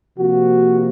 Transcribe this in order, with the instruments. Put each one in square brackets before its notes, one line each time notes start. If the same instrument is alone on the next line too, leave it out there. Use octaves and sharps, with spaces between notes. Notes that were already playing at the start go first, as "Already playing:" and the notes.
[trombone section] C3 F3 A#3 F#4